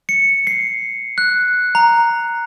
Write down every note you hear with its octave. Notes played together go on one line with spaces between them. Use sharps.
C#7
C7
F#6
A#5